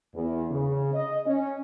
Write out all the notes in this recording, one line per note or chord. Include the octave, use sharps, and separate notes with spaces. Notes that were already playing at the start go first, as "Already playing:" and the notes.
E2
C#3
D#5
C#4